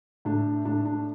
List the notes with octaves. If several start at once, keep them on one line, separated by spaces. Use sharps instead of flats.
A2 D4
A2 D4
D4